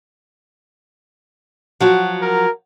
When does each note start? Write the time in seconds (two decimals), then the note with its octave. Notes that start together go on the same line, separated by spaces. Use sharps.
1.80 F3 F#3 F#4
2.21 A#4